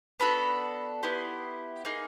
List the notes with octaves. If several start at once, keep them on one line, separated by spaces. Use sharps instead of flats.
B3 D4 F#4 A4 B5
B3 E4 G4 C6
A#3 D#4 G#4